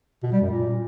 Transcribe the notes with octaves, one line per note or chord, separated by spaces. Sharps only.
B2
G3
F#2
A#2